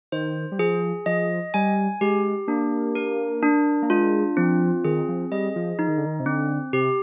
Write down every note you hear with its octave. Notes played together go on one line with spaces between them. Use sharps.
D#3 C5
G3
F3 G#4
F3 D#5
G3 G#5
G#3 G4
A#3 D4
A#4
D4
A#3
G#3 F4
F3 C4
D#3 G#4
F3
G3 D#5
F3
F3 D#4
D#3
D3
D#3
C3
D3 C4
C3 G4